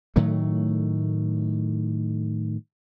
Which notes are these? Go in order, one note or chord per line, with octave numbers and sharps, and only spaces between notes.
A2 D#3 F#3 A3